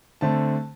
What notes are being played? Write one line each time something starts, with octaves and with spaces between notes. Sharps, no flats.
D3 A3 C4 A5